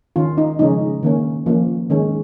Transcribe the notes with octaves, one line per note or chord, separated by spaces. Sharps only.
D#3 C#4 F4
D#4
C#3 F3 G#3 C#4 D#4
D#3 A#3 C#4
F3 A#3 C#4
D#3 G#3 C#4